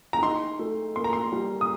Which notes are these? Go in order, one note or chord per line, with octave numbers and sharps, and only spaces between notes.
A#5
D#4 C6
A3
A#3 C6
A#5
C6
G3
D#6